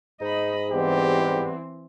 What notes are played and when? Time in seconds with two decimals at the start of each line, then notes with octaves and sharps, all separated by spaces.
0.21 G#2 D#4 D#5 B5
0.72 E2 E3 G3 B3 C4 G4